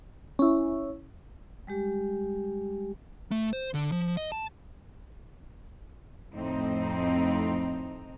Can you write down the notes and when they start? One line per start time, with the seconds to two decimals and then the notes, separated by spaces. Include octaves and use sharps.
0.39 C#4 E4
1.67 G3 G#3 G4
3.31 A3
3.53 C5
3.74 D3
3.92 F3
4.17 D#5
4.32 A5
6.34 F2 A2 C4 D#4